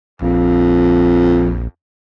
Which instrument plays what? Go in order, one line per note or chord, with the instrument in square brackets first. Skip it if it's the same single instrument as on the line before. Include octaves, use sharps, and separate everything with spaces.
[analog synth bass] A#1 [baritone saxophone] F2